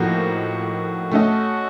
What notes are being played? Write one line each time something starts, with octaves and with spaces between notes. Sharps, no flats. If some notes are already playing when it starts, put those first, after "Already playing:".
Already playing: A2 F3 A#3 D#4 F#4 A#4
A3 C#4 F#4 A4 D#5